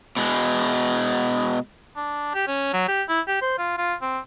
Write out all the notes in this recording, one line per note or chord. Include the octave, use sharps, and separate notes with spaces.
B2 G#3
D4
G4
C#4
F#3
G4
E4
G4
C5
F4
F4
C4